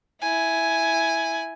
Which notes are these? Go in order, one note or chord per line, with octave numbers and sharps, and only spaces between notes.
E4 G#5